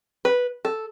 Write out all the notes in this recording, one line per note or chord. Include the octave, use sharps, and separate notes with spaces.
B4
A4